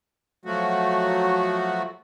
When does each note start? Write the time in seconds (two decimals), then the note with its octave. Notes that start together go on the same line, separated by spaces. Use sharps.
0.45 F3 F#3 A3 F#4